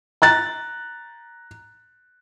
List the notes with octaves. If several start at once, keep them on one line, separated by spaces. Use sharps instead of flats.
A#5 F#6 A6